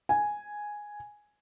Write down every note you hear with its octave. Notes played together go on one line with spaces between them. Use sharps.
G#5